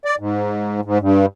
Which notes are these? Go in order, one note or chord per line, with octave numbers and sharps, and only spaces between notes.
D5
G#2
G#2
G2